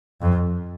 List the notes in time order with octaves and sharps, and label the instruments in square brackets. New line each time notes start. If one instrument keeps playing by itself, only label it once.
[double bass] F2